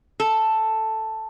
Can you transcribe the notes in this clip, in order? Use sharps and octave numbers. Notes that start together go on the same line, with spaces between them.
A4